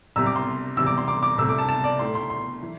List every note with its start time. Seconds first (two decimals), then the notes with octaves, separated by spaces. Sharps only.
0.16 C2 C3 G3 E6
0.26 D6
0.36 C6
0.77 E2 C3 G3 E6
0.87 D6
0.98 C6
1.08 D6
1.23 D6
1.38 C2 C3 A3 E6
1.49 D6
1.58 A5
1.69 A5
1.84 D5
1.99 A2 A3 C6
2.15 C6
2.30 C6
2.62 E3